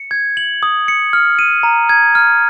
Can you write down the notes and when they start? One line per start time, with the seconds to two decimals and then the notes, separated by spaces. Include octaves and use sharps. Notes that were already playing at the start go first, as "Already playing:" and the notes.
Already playing: C#7
0.11 G#6
0.37 F#7
0.63 D#6
0.88 C#7
1.13 F6
1.39 D#7
1.63 A#5
1.89 G#6
2.15 F6